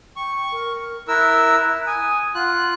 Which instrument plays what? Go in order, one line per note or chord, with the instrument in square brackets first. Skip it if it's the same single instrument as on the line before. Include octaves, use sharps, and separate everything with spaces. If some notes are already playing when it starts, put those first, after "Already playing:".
[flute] G5 [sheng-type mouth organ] C#6
[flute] A#4
[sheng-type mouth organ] E4 A#4 E6 [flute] F#6
[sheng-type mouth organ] G#5 [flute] D#6
[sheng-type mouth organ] F4 F#6 [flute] F#5